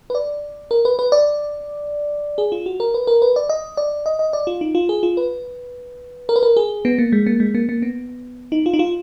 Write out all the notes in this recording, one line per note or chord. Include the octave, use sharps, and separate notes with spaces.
B4
D5
A#4
B4
B4
D5
G#4
F4
F#4
A#4
B4
A#4
B4
D5
D#5
D5
D#5
D#5
D5
F4
D#4
F4
G#4
F4
B4
A#4
B4
A#4
G#4
B3
A#3
G#3
A#3
G#3
A#3
A#3
B3
D#4
F4
D#4
F4